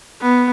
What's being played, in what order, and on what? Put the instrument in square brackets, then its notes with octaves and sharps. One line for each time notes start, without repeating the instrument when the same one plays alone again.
[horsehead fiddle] B3